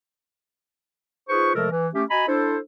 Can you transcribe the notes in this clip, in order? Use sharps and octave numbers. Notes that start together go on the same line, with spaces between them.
D#4 F4 G#4 B4 C5 C#6
C3 F3 G#3 A3 A4 A#4
E3
A3 C#4 G4
F#4 D#5 G#5 A#5 B5
D4 E4 A4 C5